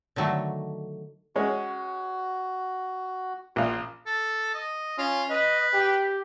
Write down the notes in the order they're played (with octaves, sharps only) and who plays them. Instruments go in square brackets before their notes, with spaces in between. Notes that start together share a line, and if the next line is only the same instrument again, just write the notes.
[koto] D3 D#3 F#3 A3
[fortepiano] G#3 C#4 [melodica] F#4
[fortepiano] A#1 F5 [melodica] F4
[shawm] A4
D#5
[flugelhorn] C#4 [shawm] F4
[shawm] B4 [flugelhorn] D#5
[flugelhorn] G4